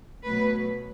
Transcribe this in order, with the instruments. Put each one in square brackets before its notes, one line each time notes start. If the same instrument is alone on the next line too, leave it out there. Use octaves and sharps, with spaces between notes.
[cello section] B2 F#3 A3 B4